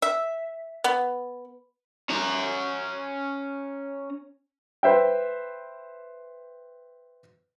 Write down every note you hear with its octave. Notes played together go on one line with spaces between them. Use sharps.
E5
B3
C#4 A#5
B4 C5 E5 G5